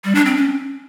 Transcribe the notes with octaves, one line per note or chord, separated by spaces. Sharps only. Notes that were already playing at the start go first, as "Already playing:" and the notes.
G3
D4
C4
C#4